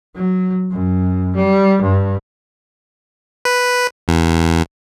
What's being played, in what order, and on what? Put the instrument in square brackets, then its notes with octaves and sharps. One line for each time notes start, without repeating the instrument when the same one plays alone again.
[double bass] F#3
F#2
G3
G2
[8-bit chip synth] B4
E2